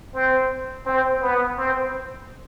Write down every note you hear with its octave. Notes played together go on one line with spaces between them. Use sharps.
C4
C4
B3
C4